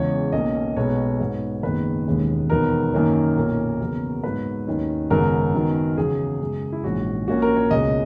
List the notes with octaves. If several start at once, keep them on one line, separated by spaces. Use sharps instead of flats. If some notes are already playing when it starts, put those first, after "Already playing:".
Already playing: E2 C#3 E3 G#3 C#5
B1 B2 A#3 C#4 D#5
B1 B2 G#3 B3 C#5
G#2 F#3 B3
F#1 F#2 D#3 G#3 B3 B4
E1 D#2 D#3 G#3 C#4
E1 E2 D#3 F#3 B3 A#4
F#2 D#3 A#3 C#4
B1 A#2 A#3 C#4
E2 C#3 F#3 B3
G#2 F#3 B3 B4
D#2 D#3 F#3 C#4
G#1 F#2 C#3 F#3 B3 A#4
F#2 D#3 F#3 B3
E2 C#3 F#3 G#4
F#2 C#3 G#3 C#4
E4
A#1 G#2 E3 G#3 C#4 F#4
A#1 A#2 A#3 C#4 F#4
A#4
C#5
C#2 B2 G#3 C#4 D#5